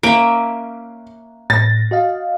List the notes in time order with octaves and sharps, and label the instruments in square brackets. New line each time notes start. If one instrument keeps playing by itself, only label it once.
[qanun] A#3 C#4 E5 [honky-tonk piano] D7
[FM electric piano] A2 A#6 [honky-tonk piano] A6
[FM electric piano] F#4 D#5 F5